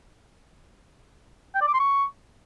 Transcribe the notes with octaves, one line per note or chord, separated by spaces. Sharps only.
G5
D5
D6
C6
C#6